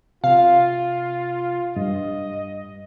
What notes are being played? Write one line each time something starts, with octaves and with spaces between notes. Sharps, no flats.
C3 F4 F5
G2 D#5